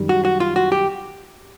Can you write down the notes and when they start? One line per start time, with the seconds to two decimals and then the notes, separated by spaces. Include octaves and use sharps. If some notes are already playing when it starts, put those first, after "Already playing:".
Already playing: F#2 D#3 G3
0.09 F#4
0.25 F#4
0.40 F4
0.56 F#4
0.72 G4